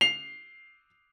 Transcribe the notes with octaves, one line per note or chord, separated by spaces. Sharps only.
C7 F7